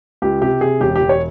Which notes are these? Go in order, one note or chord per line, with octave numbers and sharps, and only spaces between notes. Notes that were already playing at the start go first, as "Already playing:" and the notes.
C#2 G4
C3 G4
C3 G#4
E1 G4
E1 G4
C#5